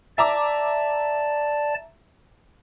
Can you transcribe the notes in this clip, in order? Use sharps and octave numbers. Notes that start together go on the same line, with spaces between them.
D5 E5 A5 A#5 D6